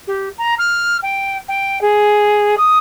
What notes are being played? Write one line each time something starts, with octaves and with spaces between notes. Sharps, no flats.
G4
A#5
F6
G5
G5
G#4
D#6